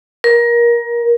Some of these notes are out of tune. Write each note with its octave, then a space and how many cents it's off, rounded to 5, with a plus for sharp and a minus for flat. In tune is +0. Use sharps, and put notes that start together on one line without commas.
A#4 +25